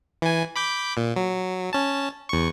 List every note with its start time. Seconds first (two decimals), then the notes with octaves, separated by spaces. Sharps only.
0.22 E3 G#5
0.56 B5 D6 G6
0.97 A#2
1.16 F#3
1.73 C#4 A5
2.29 E2 C#6